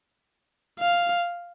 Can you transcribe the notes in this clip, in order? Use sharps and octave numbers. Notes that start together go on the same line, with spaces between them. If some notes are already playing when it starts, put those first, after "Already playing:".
F5